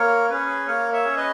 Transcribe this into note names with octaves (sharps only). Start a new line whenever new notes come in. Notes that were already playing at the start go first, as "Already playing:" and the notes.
Already playing: A#3 A#4 C#5
C#4 G#4 B4
A#3 A#4 C#5
C#5 E5
C#4 G#4
B4 D#5